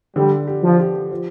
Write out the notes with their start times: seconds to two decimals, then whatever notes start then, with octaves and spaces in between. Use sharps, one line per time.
0.16 D3 G3
0.47 G4
0.63 F3
0.80 G4
1.11 F3